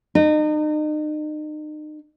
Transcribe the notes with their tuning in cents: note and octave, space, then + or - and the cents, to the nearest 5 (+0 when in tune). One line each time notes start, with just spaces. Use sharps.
D#4 -35